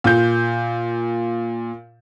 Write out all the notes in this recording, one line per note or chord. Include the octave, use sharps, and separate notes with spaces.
A#2 G6